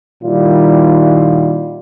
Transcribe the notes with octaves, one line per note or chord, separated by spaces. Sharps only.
A#2 D#3 G3 E4 F4